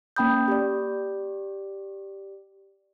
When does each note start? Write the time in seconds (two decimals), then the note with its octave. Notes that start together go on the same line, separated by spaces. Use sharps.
0.16 A#3 C#4 G5 B5 D#6 G6
0.48 G4 D5